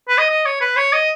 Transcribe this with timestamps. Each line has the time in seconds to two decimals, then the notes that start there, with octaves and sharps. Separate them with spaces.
0.08 B4
0.18 D#5
0.30 D#5
0.46 C#5
0.61 B4
0.77 C#5
0.93 D#5